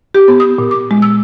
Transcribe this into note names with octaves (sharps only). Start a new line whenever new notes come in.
G4
B3
D#6
A#2
D6
G#3
E6